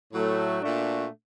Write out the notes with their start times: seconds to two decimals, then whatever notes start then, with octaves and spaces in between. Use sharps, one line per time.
0.13 A2 F#3 A3
0.61 A#2 A3 D4 F#4